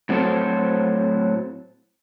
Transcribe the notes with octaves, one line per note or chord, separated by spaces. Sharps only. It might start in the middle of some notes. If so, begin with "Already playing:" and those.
A2 F#3 C4 D4 A4 C5